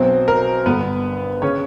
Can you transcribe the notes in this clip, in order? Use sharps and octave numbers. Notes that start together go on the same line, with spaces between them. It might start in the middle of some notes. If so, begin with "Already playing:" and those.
Already playing: B1 B2 F#3 C4 C5
A#4
G1 G2 D3 B3 B4
C#3 C#4 C#5